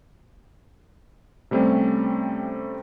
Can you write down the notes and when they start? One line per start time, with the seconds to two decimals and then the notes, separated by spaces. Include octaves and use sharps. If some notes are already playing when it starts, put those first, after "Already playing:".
1.51 C3 G3 A3 C4 C#4